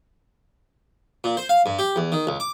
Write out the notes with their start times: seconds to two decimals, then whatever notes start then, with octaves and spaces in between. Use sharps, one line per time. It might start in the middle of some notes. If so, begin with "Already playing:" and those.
1.24 A#2
1.37 C5
1.49 F5
1.66 G2
1.79 G4
1.96 E2
2.12 D#3
2.27 C#2
2.40 D6